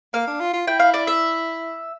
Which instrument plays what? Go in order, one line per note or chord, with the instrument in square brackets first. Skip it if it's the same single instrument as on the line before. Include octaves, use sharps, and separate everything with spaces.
[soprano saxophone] A#3 [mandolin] F5
[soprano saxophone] D4
F4
F4
[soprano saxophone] E4 [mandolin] G5
[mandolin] F5
D5
E5